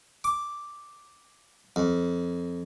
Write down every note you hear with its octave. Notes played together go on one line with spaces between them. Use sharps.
D6
F2